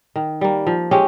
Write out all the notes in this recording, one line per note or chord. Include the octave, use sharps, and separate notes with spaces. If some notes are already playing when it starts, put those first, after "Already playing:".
D#3
G3 A#3
F3
G#3 C#4 G4